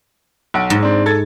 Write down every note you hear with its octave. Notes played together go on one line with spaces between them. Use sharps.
B1 F#5 D7
G#2
C4 D4
A4 G#6 A6